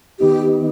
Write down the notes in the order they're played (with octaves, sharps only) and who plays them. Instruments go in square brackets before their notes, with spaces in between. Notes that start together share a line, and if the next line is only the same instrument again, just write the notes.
[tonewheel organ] D#3 B3 D#4 [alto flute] G4